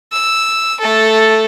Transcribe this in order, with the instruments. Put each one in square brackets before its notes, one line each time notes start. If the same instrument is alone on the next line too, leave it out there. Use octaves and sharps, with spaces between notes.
[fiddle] E6
A3 A4